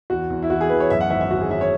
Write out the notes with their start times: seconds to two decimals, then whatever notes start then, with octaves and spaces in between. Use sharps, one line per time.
0.10 E2 F#4
0.30 E2
0.43 E4
0.50 E2 F#4
0.61 G#4
0.70 E2 B4
0.80 C#5
0.90 F#2 E5
1.01 F#5
1.10 G#1 E5
1.21 E5
1.30 G#1 F#4
1.41 G#4
1.51 F#3 E5
1.61 C#5